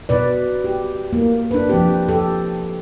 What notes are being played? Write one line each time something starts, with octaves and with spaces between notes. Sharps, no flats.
B2 B4 D5
G4
A#3
D4 B4
F3 C4 G4
G4 A4